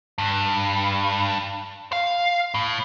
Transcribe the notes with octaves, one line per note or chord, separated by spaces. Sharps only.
G2
F5
A2